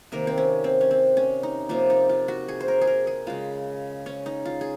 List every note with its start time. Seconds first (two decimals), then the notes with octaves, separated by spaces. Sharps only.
0.12 C3 D#3 A#3 A#4
0.27 C4
0.38 C#4
0.64 C4
0.81 C#4
0.91 C4
1.17 C#4
1.43 D#4
1.69 C3 F3 A#3 F4
1.90 D#4
2.09 F4
2.28 F#4
2.48 G#4
2.60 C5
2.68 A#4
2.81 G#4
2.87 A#4
3.07 G#4
3.27 C#3 G#3 F4
4.06 C#4
4.26 D#4
4.45 F4
4.61 G#4